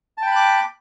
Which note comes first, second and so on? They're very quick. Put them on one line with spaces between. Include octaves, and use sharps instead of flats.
A5 G5 B5 F#6 D6